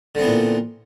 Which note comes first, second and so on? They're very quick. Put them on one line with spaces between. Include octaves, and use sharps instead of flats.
D3 C4 B3 E3 A#2